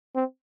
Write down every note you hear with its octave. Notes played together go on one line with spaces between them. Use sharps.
C4